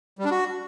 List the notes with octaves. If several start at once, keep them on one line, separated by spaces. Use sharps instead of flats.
G3
D4
F#4